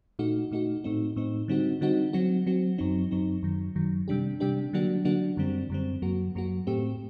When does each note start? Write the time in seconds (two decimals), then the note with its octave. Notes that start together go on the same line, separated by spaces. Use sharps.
0.19 A#2 A3 D#4 F#4
0.51 A#2 A3 D#4 F#4
0.84 A2 A3 C4 D#4
1.16 A2 A3 C4 D#4
1.48 D3 G3 C4 D#4 F#4
1.81 D3 G3 C4 D#4 F#4
2.13 F#3 C4 F#4
2.47 F#3 C4 F#4
2.78 F#2 F#3 C4 D#4
3.11 F#2 F#3 C4 D#4
3.43 F#2 D#3 F#3
3.75 F#2 D#3 F#3
4.08 C3 G3 D4 G4
4.40 C3 G3 D4 G4
4.73 D3 F#3 A#3 D4 F#4
5.05 D3 F#3 A#3 D4 F#4
5.37 F#2 D3 G3 C4
5.70 F#2 D3 G3 C4
6.02 F#2 F#3 A#3 F#4
6.35 F#2 F#3 A#3 F#4
6.67 A2 A3 C4 G4